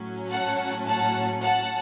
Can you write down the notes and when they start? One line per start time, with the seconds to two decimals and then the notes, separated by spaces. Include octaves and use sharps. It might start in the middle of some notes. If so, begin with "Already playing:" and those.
Already playing: A2 F#3 C#4
0.31 F#5 A5
0.87 F#5 A5
1.43 F#5 A5